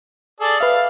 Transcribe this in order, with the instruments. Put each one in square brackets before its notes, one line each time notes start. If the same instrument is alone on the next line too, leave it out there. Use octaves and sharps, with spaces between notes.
[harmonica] G#4 A4 D5
[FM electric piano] B4 E5 [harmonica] F5